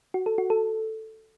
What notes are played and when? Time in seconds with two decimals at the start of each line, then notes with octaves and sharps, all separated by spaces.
0.14 F#4
0.26 A4
0.38 F#4
0.50 A4